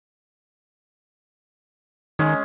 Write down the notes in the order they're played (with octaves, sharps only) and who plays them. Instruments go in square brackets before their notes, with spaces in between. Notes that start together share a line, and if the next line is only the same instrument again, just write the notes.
[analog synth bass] D#3 [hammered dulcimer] G#3 C#4